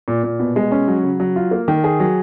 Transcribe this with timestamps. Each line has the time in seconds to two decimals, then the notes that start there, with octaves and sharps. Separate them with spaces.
0.08 A#2
0.23 A#2
0.40 B2
0.56 G#3
0.72 C#4
0.88 F#3
1.03 C#3
1.20 F#3
1.36 F4
1.51 A#3
1.68 D#3
1.84 G#4
2.00 F#3